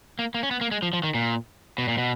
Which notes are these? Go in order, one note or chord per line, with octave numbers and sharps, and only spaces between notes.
A#3
A#3
C#4
B3
A#3
G#3
F3
F3
D#3
A#2
B2
A#2
B2